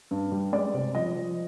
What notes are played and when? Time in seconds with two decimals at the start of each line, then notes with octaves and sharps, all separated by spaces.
0.11 G2
0.32 G3
0.53 G#3 D5
0.74 C3
0.95 F3 D#5
1.15 F3